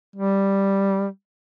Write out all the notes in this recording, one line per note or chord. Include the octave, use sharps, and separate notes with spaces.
G3